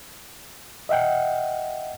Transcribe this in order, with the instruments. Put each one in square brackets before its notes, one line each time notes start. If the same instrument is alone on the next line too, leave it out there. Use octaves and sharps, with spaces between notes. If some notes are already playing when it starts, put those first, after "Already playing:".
[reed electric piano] D#5 E5 F#5 G5